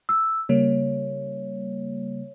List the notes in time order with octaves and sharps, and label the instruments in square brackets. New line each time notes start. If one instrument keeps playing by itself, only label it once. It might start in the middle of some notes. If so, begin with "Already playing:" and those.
[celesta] E6
[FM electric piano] C#3 G3 A#3 [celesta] C#5